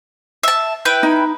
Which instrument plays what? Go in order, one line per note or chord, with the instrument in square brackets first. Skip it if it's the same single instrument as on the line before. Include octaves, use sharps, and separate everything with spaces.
[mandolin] E5 A5
E4 B4 G5
[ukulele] D#4